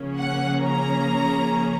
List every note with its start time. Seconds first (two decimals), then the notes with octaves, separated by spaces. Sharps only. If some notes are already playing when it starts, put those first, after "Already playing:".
Already playing: C#3 F3 A#3 C#4
0.17 F#5
0.62 A#5